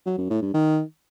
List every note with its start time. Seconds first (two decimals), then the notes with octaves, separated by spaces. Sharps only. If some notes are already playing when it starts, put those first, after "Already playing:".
0.06 F#3
0.18 F#2
0.30 A2
0.42 G2
0.54 D#3